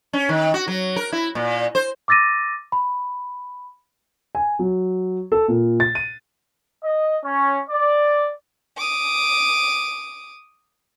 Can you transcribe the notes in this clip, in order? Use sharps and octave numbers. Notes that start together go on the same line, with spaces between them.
C#4
D#3
F#4
F#3
A#4
E4
A#2
C5
D6 E6 A6 A#6 D#7
B5
G#5
F#3
A4
A#2
A6
D#7
D#5
C#4
D5
D6 D#6